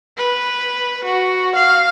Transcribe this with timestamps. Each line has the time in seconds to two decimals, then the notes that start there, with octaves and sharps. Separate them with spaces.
0.17 B4
1.05 F#4
1.55 F5